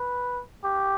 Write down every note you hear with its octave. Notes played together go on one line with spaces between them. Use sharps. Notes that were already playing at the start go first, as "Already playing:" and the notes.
Already playing: B4
G4